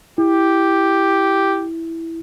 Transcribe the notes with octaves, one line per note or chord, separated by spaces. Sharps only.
E4 G4